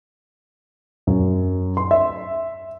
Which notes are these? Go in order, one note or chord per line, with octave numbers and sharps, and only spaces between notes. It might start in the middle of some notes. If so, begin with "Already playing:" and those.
F#2
C6
E5